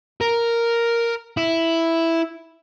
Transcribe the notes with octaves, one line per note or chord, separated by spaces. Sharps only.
A#4
E4